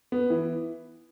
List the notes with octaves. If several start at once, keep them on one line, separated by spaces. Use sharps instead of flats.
B3
E3